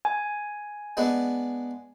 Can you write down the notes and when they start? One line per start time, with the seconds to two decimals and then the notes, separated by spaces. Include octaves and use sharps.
0.05 G#5
0.97 G#3 B3 D4